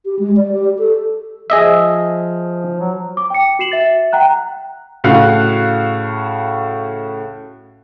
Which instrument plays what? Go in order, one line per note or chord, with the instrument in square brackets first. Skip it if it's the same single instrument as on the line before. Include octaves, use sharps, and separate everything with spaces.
[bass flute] G4
G#3
D5
G4
A4
[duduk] F3 [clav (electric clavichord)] G#4 D#5 E5
[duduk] F#3
[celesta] D6
G5 C#7
F#4 C7 E7 F#7
E5 A6
F#5 G5 A#5 F#6
[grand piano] A2 C#3 F#4 F5 F#6